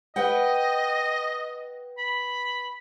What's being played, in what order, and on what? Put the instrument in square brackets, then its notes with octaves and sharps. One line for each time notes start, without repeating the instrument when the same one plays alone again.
[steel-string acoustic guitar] B4 F#5 G5 [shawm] D#5
[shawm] B5